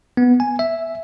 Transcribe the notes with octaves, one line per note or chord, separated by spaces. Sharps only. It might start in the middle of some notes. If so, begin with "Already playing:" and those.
B3
G#5
E5